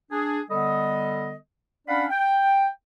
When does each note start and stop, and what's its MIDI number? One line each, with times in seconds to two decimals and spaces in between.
0.11 0.41 62
0.11 0.41 68
0.50 1.35 50
0.50 1.35 55
0.50 1.35 59
0.50 1.35 69
0.50 1.35 75
1.88 2.05 61
1.88 2.05 62
1.88 2.05 74
1.88 2.05 77
1.88 2.05 78
1.88 2.05 83
2.10 2.67 79